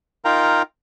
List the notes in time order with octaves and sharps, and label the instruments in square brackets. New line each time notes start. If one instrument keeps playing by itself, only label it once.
[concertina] D#4 F4 A#4 F5 G5 A#5